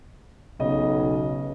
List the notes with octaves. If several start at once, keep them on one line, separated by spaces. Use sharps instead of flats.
B1 C#3 D#5